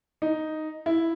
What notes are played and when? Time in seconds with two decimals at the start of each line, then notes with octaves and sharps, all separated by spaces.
0.22 D#4
0.86 E4